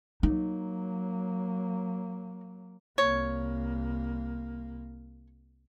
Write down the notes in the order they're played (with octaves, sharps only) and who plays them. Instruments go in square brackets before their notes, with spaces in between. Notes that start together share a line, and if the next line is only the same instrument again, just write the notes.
[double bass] F#3 A#3 [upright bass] D#4
[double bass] C2 A#3 [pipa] C#5